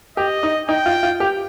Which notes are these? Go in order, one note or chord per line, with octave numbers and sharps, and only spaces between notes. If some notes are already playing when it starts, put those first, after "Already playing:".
G4 D#5
D#4
D#4 G5
F4
F4
G4